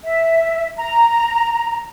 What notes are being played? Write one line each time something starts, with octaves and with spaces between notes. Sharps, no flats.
E5
A#5